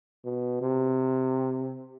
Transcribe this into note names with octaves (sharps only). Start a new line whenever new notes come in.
B2
C3